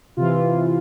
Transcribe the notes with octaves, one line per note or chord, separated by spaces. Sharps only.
C3 E3 F4